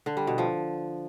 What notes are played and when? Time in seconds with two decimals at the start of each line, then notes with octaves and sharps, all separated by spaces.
0.06 D3
0.17 G3
0.27 B2
0.38 F3